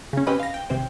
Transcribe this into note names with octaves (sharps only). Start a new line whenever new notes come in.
C#3 C#4
C4 C#4 G4 B4 D#5 B5
F5 A#6
G5
G#1 C3 C4 C5 G5